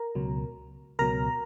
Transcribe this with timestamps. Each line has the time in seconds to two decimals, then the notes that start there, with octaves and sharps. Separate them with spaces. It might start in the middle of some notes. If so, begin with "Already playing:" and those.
Already playing: A#4 A#5
0.15 C#2 B2 F#3
0.99 C#2 B2 F#3 A#4 A#5